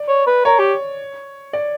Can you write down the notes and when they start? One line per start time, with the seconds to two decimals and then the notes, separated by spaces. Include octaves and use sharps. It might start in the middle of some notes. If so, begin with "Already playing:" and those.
Already playing: D5
0.08 C#5
0.27 B4
0.45 A#4 C#5
0.59 G4
1.53 D5